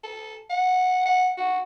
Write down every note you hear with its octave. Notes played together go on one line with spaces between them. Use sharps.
A4
F#5
F#5
F#4